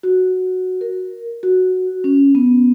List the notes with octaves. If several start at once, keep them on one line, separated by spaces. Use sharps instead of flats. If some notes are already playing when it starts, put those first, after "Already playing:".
F#4
A#4
F#4
C#4
B3